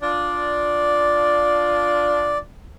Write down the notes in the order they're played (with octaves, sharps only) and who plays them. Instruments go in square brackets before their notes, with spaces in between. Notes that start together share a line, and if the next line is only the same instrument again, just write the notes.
[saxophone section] D4 F4 [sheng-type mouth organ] D5